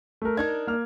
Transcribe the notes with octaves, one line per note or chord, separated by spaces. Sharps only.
A3 A#4
D4 D#4 A#4 G#6
A#3 F6